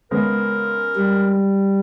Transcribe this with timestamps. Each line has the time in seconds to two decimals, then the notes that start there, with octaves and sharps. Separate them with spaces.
0.11 C#3 G#3 B3 A#4
0.96 G3